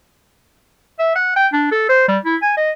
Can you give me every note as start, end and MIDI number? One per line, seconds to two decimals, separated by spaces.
0.99 1.15 76
1.16 1.35 78
1.36 1.47 79
1.53 1.68 62
1.72 1.87 69
1.89 2.08 72
2.08 2.19 55
2.25 2.36 64
2.42 2.53 80
2.57 2.71 75